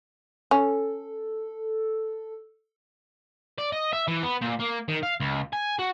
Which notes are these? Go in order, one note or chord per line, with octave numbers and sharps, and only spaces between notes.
C#4 A4
D5
D#5
E5
E3
B3
A#2
A#3
D#3
F5
C#2
G#5
F#4